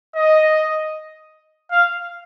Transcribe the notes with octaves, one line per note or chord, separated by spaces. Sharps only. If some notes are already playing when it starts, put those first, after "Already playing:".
D#5
F5